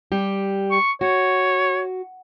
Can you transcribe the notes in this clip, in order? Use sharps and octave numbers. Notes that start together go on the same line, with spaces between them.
G3 G4
C#6
F#4 C#5